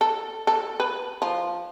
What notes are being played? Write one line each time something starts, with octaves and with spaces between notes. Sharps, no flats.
A4
A4
B4
F3